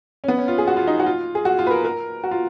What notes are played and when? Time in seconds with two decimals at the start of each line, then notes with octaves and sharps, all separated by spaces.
0.24 C#4
0.28 B3
0.38 C#4
0.48 F4
0.58 G#4
0.67 F#4
0.77 F4
0.87 D#4
1.00 F#4
1.06 F4
1.35 G#4
1.45 F#4
1.59 F4
1.67 B4
1.71 A#4
1.85 A#4
2.24 F#4
2.31 F4